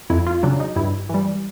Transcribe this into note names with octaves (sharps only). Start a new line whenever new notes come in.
F2 E4
F4
C#3 F#3 D4
D#4
G2 E4
E3 G3